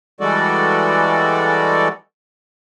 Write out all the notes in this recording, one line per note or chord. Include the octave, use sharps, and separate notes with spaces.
E3 G3 G#3 F#4 A4 D5